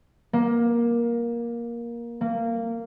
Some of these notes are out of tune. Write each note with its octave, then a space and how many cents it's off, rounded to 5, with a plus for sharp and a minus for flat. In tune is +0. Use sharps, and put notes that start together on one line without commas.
A#3 +15
A#3 -20